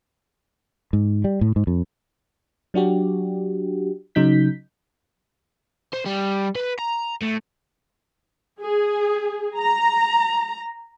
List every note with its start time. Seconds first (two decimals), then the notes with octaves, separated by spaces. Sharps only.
0.93 G#2
1.24 G3
1.41 A2
1.56 G#2
1.67 F2
2.74 F#3 D4 F#4 G4
4.15 C#3 F#3 D#4 G6 B6
5.94 C5
6.06 G3
6.55 B4
6.79 A#5
7.21 A2
8.62 G#4
9.58 A#5